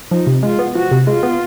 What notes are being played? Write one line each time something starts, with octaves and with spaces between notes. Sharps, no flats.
F3 D#4
C3
G#3 F4
B3
F3 F#4
C3
G#3 F4
B3